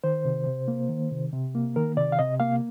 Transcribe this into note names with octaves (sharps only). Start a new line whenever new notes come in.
D#3 C5
C3
C3
A#3
D#3
C3
C3
A#3
D#3 A#4
C3 D5
F5
C3 D#5
A#3 F5